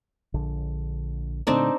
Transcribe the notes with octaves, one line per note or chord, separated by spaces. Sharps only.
A#1 D3
A#2 D3 A3 C4 D4 D#4